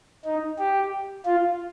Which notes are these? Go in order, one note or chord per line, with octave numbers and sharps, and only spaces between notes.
D#4
G4
F4